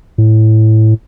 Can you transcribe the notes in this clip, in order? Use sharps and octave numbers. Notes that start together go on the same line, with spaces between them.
A2